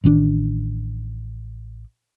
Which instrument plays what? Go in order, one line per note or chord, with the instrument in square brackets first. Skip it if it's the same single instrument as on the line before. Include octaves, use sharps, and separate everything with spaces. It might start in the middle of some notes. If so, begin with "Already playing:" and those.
[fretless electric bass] A1 D#3 A3 D4